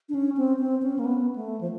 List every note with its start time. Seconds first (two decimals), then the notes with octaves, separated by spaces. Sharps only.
0.09 D4
0.14 C#4
0.37 C4
0.60 C4
0.82 C#4
0.99 A#3
1.05 B3
1.36 A3
1.61 F3